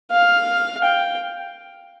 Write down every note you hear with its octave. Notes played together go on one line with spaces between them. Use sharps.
F5
G5